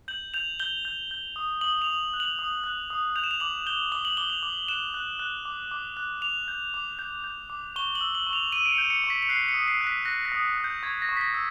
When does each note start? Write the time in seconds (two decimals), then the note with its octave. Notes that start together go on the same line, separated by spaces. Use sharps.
0.08 G6 F#7
0.34 G6 F7
0.60 G6 G7
0.85 G6
1.11 G6
1.36 D#6
1.61 D#6 F#7
1.82 F7
1.87 D#6
2.14 F#6
2.20 F#7
2.39 D#6
2.64 F#6
2.90 D#6
3.16 G6 F7
3.24 E7
3.31 F7
3.40 D6 F#7
3.67 G6 G7
3.92 D6 G7
4.05 F#7
4.17 D6 G7
4.30 F7
4.43 D6
4.68 F#6 E7
4.94 F#6
5.19 F#6
5.45 D6
5.71 D6
5.97 F#6
6.22 D6 F7
6.48 G6
6.74 D6
6.99 G6
7.24 G6
7.50 D6
7.76 C#6 G7
7.95 F#7
8.01 E6
8.15 F#7
8.27 C#6
8.33 F7
8.52 E6 D#7
8.66 D7
8.72 C#7
8.78 G6
8.90 C#7
9.04 C#6
9.10 B6
9.23 C#7
9.29 F#6 C7
9.49 C#7
9.54 D#6
9.68 C7
9.81 F#6
9.87 B6
10.05 F#6 A#6
10.25 A#6
10.32 D#6
10.58 F#6
10.64 G6
10.83 C#6 G#6
11.02 A#6
11.09 C#6
11.17 B6
11.21 A#6
11.34 E6